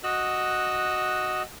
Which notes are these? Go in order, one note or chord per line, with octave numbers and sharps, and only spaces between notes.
F#4 D#5 E6 F#6